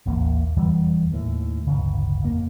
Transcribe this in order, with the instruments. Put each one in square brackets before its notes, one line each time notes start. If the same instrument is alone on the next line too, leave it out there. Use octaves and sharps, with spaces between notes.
[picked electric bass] D#1 A1 D#2 A#3
F1 E2 E3 G3
D#2 A2
D1 G1 C#3
F2 A#3